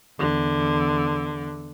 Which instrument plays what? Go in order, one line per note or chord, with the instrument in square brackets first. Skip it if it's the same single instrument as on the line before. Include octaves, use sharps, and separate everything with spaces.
[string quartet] E2 D3